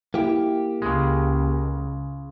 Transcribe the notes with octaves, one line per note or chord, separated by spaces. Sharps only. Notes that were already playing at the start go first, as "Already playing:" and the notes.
A#3 E4 G4 A#4
C#2 C#3 G#3